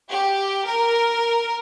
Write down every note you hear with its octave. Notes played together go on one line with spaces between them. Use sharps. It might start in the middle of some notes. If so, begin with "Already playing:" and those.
G4
A#4